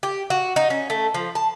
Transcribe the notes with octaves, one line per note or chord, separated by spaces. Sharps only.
G4
F#4
D#4
C#4
A3
F3
A5